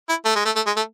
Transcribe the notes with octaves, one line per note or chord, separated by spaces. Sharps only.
E4
A3
G#3
A3
A3
G#3
A3